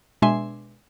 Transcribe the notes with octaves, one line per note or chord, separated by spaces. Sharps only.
B2 G#3 D4 E5 G#5 C6